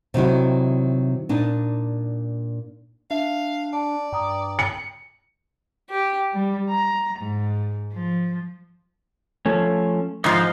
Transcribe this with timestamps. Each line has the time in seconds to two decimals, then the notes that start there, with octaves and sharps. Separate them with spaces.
0.14 C3 D#3 F#3 E4
1.29 A#2 D4 D#4
3.11 D4 E5 F5
3.73 D5 A5
4.13 G2 G5 A#5 D#6
4.59 C#7
5.91 G4
6.33 G3
6.70 A#5
7.19 G#2
7.93 F3
9.46 F3 A3 C#4
10.24 G#2 F3 D#5